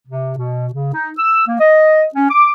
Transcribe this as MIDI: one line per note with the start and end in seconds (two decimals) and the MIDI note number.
0.08 0.34 48
0.37 0.68 47
0.74 0.93 49
0.94 1.10 63
1.19 1.45 88
1.47 1.57 58
1.59 2.05 75
2.15 2.29 61
2.30 2.52 86